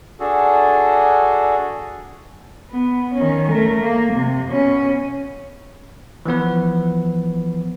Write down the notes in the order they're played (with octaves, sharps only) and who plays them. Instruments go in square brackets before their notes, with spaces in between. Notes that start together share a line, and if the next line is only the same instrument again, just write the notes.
[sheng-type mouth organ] D4 F#4 G#4 A4
[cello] B3
D#3 C#4
A3 A#4
A#3
C3
B2 C#4
[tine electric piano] E3 F3 B3 B4